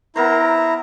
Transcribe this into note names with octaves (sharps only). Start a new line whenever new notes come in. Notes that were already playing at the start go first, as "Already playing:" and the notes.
B3 E4 A#4 C5 A#5